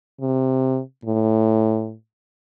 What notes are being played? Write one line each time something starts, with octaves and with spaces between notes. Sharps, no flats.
C3
A2